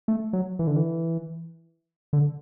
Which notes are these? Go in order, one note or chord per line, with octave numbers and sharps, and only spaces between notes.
A3
F#3
E3
D3
E3
D3